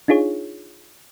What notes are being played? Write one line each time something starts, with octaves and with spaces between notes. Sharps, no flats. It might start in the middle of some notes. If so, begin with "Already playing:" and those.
D4 D#4 F4 G#4 C#5